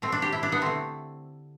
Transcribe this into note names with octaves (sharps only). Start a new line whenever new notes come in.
B2 A3 C4
D4
G4
E4
D4
B3
D3 A3 C4